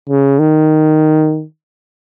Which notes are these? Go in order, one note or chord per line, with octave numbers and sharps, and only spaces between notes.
C#3
D#3